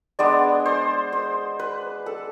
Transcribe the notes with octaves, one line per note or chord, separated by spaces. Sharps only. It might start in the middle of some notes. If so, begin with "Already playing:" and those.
G#3 B3 D4 D5
C5
C5
B4
A4